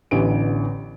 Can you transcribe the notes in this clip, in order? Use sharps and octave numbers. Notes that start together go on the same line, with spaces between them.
A1 D3 E3 B3 D7